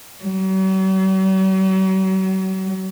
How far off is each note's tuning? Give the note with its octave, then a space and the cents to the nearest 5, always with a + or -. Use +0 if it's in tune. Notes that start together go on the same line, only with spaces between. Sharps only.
F#3 +45